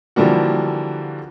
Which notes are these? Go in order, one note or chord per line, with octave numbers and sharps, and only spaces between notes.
D3 E3 F3 G3 A#3 F#4